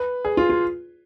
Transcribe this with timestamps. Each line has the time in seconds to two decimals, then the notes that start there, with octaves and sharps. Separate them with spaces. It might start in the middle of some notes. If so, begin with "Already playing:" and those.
Already playing: B4
0.25 G#4
0.37 F4
0.50 F4